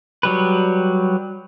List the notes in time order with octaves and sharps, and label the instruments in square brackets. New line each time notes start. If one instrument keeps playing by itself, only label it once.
[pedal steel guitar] F#3 G3 B4